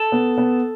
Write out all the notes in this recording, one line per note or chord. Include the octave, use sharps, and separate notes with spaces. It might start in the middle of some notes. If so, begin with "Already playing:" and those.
Already playing: A4 A5
B3
B3